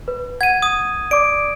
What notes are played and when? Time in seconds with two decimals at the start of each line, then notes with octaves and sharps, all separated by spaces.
0.08 B4
0.41 F#5 G#6 D#7
0.62 D#6
1.11 D5 D6 D7